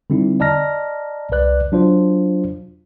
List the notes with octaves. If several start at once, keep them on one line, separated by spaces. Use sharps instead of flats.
D3 G3 C4 D#4 E4
D5 D#5 A5 A#5 F6 A#6
C2 B4 D5 F#6
F#3 D4 F4 C5